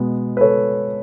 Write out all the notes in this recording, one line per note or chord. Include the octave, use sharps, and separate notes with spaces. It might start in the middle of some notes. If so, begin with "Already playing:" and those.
Already playing: B2 G#3 B3
B4
A4 C#5